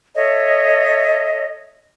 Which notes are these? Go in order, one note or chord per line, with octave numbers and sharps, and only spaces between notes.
A4 C#5 D#5 E5